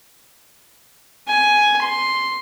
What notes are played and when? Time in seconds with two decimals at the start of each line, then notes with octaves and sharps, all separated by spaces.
1.28 G#5
1.82 C6